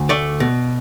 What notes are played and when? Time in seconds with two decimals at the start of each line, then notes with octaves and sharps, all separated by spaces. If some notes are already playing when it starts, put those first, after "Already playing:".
Already playing: D2
0.09 A3 D5
0.40 B2